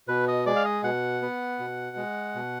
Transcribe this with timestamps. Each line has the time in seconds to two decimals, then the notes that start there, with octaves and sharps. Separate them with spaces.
0.08 B2 B4
0.28 D#5
0.46 G#3 D5
0.56 F5
0.65 D#5
0.83 B2 F#5
1.22 B3
1.59 B2
1.97 G#3
2.35 B2